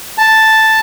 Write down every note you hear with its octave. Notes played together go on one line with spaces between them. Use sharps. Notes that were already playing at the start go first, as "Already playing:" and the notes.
A5